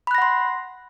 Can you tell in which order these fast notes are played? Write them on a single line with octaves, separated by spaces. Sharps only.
B5 F#6 A#6 F#5 C6